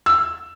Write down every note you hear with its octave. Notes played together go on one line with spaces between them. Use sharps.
E6